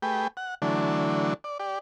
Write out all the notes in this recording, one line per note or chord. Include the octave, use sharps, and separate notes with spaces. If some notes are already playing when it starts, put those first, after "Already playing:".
A3 G4 G#4 B4 G5
F#5
D3 E3 F#3 A3 D4
D5
G4 D5